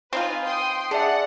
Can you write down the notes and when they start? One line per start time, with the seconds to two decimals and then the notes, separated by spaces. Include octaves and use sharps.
0.13 C4 D#4 F4 B4 G#5
0.44 G5 C6 D#6
0.91 D4 G#4 D5 E5 F#5